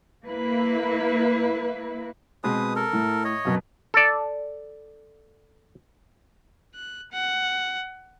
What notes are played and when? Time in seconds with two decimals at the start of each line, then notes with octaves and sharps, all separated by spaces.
0.25 A#3 E4 B4
2.44 B2 G#3 C4 B4 D#6
2.76 A4 A#4
2.93 A2
3.24 C#5 D#5
3.45 F#2 B2 F#3
3.94 A4 D5
6.75 F#6
7.12 F#5